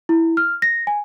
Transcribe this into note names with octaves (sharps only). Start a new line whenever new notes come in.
E4
F6
A#6
G#5